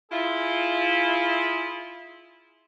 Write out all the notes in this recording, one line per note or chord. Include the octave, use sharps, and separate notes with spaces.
E4 F4 G#4